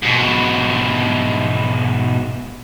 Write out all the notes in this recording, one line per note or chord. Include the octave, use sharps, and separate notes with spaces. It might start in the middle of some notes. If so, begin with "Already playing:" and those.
G#2 B2